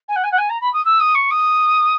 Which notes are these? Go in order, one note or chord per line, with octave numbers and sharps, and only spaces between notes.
G#5
F#5
G#5
F#5
G#5
A#5
B5
D#6
E6
D#6
C#6
D#6